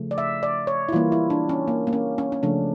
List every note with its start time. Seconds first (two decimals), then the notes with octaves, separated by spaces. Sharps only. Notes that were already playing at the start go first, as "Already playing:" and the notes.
Already playing: C#3 F3 A3
0.11 D5
0.18 E5
0.43 D5
0.67 C#5
0.89 E4
0.92 E3 G3 A#3 F4
1.12 E4
1.30 D4
1.49 C#4
1.68 A#3
1.87 A#3
1.93 C#4
2.18 C#4
2.32 C#4
2.43 C#3 F3 A3 D4